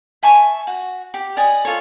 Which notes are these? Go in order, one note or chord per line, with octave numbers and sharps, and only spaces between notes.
E5 G#5 A5 C#6
F#4
G4
D5 D#5 G#5 D#6
F4 A4 C#5